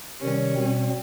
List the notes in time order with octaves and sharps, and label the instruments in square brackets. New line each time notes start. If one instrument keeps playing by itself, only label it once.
[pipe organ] C3 D#3 G3 [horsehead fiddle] C#4
[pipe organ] B2 G3 C4